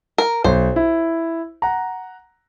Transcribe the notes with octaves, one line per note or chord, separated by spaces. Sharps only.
A#4
B1 C5
E4
F#5 A#5